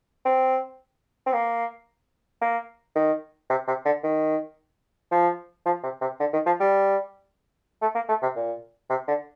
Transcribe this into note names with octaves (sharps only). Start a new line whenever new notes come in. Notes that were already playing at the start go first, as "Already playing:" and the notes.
C4
C4
A#3
A#3
D#3
C3
C3
D3
D#3
F3
F3
C3
C3
D3
D#3
F3
G3
A3
A#3
A3
C3
A#2
C3
D3